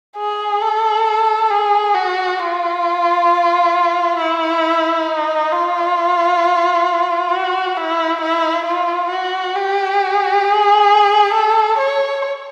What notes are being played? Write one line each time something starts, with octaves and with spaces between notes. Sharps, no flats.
G#4
A4
G#4
F#4
F4
E4
D#4
F4
F#4
E4
E4
F4
F#4
G4
G#4
A4
C#5